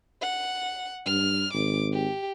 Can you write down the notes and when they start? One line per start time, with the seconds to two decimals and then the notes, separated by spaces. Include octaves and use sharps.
0.22 F#5
1.06 G2 F6
1.53 G#1 D6
1.93 G4